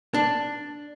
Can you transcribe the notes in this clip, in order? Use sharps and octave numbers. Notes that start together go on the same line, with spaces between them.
D4